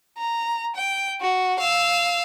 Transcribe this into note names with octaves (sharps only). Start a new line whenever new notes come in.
A#5
G5
F#4
F5 E6